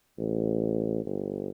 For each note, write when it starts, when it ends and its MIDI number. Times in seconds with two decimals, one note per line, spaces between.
0.18 1.04 33
1.05 1.50 31